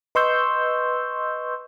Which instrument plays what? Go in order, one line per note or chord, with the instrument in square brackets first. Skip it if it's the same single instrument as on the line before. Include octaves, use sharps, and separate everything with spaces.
[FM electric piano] B4 D#5 C6 C#6 E6 G6